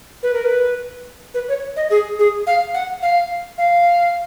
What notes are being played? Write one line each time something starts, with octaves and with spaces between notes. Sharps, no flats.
B4
A#4
B4
B4
C#5
D#5
G#4
G#4
F5
F#5
F5
F5